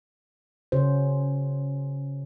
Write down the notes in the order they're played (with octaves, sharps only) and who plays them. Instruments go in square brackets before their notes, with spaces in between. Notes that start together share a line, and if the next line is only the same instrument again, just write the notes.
[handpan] C#3 C#4 F#4 C5